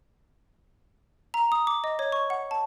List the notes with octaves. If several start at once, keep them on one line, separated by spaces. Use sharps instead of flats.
A#5
D#6
D6
D#5
C#5
C#6
F#5
A5